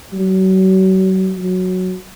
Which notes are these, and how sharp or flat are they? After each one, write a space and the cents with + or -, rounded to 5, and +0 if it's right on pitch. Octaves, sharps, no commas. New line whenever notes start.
F#3 +35
F#3 -5